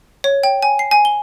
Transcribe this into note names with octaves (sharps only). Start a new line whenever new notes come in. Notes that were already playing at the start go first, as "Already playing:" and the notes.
C#5
G5
G#5
C7
G#5
G7